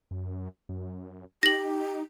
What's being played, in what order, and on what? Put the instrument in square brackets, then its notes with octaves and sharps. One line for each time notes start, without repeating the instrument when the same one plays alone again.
[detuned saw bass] F#2
F#2
[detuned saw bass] D#4 [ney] G4 [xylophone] A#6 F#7